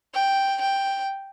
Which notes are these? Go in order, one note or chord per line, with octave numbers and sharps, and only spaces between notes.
G5
G5